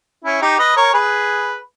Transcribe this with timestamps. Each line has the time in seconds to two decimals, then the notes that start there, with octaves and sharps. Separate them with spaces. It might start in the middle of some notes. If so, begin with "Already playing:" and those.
0.24 C#4 E4
0.42 D#4 G4
0.59 B4 D#5
0.76 A#4 C#5
0.94 G#4 B4